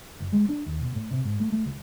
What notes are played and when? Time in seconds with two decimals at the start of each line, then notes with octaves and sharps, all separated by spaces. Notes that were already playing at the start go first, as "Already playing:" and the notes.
0.20 F#1
0.33 G#3
0.49 D4
0.66 D#2
0.81 B2
0.95 A2
1.11 C3
1.25 G#2
1.40 A3
1.52 A3
1.66 C#2